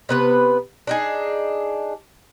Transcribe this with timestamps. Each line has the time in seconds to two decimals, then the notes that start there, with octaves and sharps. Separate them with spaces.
0.09 C3 B3 B4
0.87 D4 D#4 G#4